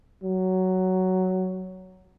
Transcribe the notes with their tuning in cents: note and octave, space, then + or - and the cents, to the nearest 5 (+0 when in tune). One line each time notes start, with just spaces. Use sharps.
F#3 +10